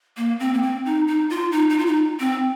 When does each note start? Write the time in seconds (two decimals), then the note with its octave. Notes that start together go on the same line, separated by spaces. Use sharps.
0.17 A#3
0.40 C4
0.54 A#3
0.62 C4
0.85 D#4
1.08 D#4
1.30 F4
1.52 D#4
1.70 D#4
1.79 F4
1.86 D#4
2.20 C4